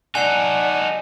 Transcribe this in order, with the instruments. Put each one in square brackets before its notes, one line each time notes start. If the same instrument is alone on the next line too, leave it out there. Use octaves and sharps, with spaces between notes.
[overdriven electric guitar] D#4 A4 [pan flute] D5 [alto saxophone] F#5 [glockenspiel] G#5 C7